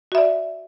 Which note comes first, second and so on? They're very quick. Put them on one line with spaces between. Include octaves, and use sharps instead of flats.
F#4 E5 D5